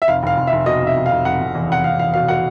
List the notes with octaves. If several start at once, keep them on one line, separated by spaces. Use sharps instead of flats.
E5
F1 F5
F1 F5
F1
E5
F1
B2 D#5
F1 E5
F1
F5
F1
F1 F#5
F1
E2
F1 F#5
F1 F5
E2 F5
B2 F5
B2 F#5